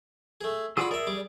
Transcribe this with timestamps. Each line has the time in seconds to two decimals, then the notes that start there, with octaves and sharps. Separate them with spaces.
0.41 A3 G#4
0.77 F4 F#4 G#4 D5 B5 E6
0.91 G#4 A#4 D5 E5
1.07 G3 D6